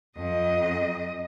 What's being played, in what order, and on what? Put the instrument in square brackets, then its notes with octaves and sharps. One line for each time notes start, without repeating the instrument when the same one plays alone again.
[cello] F2 D#5